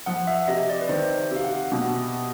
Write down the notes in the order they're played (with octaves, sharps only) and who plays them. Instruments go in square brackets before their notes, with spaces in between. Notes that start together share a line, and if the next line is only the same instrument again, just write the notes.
[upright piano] F3 [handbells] F#5
[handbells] E5
[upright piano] C3 [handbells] D#5
[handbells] D5
B4
[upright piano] D#3 [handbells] C5
[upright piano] C3
[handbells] F5
F#5
[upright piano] B2